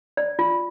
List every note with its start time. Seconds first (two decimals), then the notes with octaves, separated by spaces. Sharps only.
0.17 D5
0.39 F4